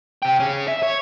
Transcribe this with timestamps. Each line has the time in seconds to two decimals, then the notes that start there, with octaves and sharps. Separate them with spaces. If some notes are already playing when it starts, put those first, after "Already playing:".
0.23 C3 G5
0.40 C#4 G#4
0.68 E5
0.83 C#5